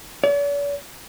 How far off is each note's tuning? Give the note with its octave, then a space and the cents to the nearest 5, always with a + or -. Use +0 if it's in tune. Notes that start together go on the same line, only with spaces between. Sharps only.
D5 -45